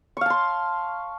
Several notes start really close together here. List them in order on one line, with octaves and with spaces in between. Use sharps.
C#6 F5 A5 C6